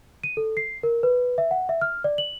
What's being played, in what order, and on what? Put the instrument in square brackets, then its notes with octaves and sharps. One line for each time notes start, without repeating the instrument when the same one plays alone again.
[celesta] D#7
A4
C7
A#4
B4
E5
F#5
E5
F6
D5
F#7